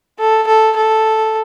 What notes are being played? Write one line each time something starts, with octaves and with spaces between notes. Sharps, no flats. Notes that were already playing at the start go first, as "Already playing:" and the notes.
A4
A4
A4